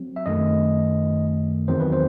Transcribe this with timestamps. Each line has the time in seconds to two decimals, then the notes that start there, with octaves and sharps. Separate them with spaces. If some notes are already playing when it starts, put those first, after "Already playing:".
Already playing: F#3 C4
0.16 E5
0.26 F#2 D#3 A3 D#5
1.68 E2 D#3 F#3 C4 C5
1.80 B4
1.92 C5